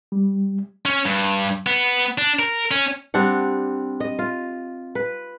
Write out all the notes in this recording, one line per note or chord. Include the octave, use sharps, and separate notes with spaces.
G3
C#4
G2
B3
D4
A#4
C#4
G3 C4 D4 F#5
D#5
F4
B4